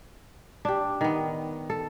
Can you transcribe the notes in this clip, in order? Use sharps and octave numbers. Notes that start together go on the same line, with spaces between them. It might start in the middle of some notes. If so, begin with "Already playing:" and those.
D4 G4
D#3 B3
A4